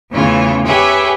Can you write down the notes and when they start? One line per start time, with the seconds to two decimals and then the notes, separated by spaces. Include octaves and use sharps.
0.11 E2 C#3 E3 A3 C#4 F4
0.66 G4 G#4 B4 C#5 E5